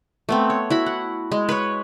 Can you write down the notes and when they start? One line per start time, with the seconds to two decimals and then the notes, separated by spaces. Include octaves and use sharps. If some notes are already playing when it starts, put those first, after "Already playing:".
0.29 A3 B3 C4
0.50 C#5
0.70 E4 F#4 B5
0.86 F#5
1.32 G#3
1.49 B4 C#5